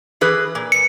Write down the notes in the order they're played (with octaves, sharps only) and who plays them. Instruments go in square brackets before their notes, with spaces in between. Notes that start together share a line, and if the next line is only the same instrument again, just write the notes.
[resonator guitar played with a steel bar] E3 G#4 B4
A#2
[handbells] C#7